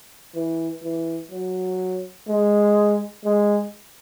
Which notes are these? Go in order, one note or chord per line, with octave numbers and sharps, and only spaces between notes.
E3
E3
F#3
G#3
G#3